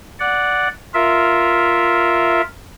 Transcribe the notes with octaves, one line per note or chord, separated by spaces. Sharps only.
D5 F#5
F4 A#4 E5